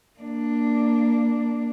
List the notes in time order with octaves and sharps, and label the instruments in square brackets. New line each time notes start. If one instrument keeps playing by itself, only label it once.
[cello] A#3 D4